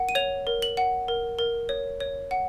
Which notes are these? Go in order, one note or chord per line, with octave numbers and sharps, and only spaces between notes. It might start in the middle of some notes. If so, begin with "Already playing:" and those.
Already playing: A#4 F#5
D#7
C#5 F7
A#4
F#7
F#5
A#4
A#4
C#5
C#5
F#5